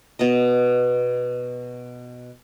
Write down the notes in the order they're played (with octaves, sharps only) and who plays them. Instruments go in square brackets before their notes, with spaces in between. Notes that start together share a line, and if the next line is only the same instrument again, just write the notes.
[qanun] B2 B3 D#5